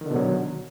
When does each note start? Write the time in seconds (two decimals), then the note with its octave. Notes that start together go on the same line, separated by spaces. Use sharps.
0.01 D#3
0.06 D3
0.11 B2
0.16 F#3